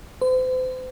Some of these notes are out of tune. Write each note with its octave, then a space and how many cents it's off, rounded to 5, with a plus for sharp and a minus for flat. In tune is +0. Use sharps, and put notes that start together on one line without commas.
C5 -40